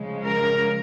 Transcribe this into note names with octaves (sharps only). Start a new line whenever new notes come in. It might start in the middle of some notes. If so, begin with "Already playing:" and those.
Already playing: C#3 F3 G#3
A#4